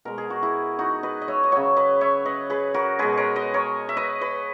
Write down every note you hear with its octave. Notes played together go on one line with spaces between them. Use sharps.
B2 G#3 A#4
G#4
F#4
E4 G#4
D#4 F#4
B4 D#5
D#5
C#5 E5
D#5
C#3 F#3 C#5 E5
B4 D#5
C#5 E5
B4 D#5
G#4 B4
F#4 A#4
B2 G#3 G#4 B4
A#4 C#5
B4 D#5
A#4 C#5
E5
B4 D#5
B4 D#5